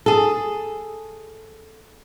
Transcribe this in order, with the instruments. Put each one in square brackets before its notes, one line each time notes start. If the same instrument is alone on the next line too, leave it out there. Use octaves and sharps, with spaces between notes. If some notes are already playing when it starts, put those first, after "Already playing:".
[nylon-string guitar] G#4 A4